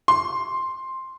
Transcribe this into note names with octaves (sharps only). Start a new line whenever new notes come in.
C6